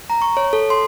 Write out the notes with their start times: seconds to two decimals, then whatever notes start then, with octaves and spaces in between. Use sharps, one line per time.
0.10 A#5
0.22 C#6
0.37 C#5
0.53 A4
0.70 C6